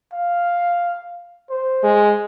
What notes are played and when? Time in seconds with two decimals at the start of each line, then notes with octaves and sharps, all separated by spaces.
0.13 F5
1.50 C5
1.83 G#3